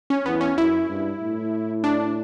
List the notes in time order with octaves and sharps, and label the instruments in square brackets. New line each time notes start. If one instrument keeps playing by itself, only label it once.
[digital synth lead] C#4
[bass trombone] E2 [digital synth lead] B3
[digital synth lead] C#4
[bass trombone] F#2 [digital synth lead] E4
[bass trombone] G2
A2
[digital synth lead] D4